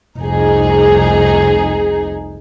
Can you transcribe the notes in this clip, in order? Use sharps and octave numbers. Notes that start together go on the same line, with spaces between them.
F1 C2 D#4 G#4